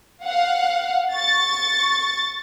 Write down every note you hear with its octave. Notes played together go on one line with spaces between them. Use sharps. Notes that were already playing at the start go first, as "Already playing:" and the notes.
F5 F#5
C#6 A6